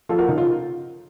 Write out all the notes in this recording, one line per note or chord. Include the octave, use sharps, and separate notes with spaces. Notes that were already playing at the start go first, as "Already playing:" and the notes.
F3 F4 A4
F#4 A#4
C#3 D#4
F4